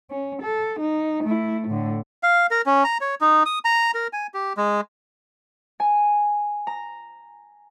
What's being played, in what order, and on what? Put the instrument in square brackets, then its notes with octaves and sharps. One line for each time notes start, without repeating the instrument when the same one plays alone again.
[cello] C#4
A4
D#4
A3 E4
A2 D3
[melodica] F5
A#4
C#4
A#5
C#5
D#4
D#6
A#5
A#4
G#5
G4
G#3
[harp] G#5
A#5